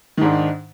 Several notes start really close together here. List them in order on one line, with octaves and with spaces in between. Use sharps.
D#3 G#2 D4